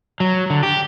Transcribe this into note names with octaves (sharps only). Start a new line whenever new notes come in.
F#3
D3
G4